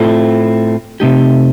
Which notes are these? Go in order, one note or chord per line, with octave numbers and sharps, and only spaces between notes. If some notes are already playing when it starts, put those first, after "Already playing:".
Already playing: A2 A3 C4 F4 A4
C3 D#3 A3 D#4 G4